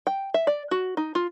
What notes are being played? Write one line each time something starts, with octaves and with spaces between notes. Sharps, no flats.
G5
E5
D5
F#4
D#4
F4